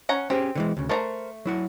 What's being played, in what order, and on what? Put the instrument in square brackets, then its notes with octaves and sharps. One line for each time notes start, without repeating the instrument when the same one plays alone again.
[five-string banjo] C#4 F#5 A#5
[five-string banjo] C4 [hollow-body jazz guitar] C#4 G4 G#4
[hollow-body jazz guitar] D3 E3 G#3
D2 C#3
[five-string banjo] A3 D5 A#5 [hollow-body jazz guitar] A#4 C5
[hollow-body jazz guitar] F#3 E4 F#5